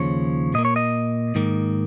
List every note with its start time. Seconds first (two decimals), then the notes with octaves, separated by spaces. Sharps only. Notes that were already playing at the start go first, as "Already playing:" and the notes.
Already playing: D#2 C#3 F3 C#5
0.54 A#2 A#3 D#5
0.65 C#5
0.76 D#5
1.35 G#2 D#3 A#3